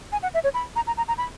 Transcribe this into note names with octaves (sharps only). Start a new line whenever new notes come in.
G#5
F#5
E5
C#5
B5
A#5
A#5
A#5
A#5
B5